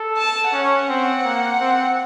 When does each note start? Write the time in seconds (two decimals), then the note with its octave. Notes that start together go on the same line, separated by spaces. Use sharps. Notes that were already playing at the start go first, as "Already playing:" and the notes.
Already playing: A4
0.17 A5
0.53 C#4 F#5
0.89 C4
1.24 A#3
1.60 C4